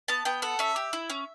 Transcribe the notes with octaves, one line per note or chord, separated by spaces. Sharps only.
B3 A5
B3 G5
A4 F#5
C#4 E5
G4
E4
C#4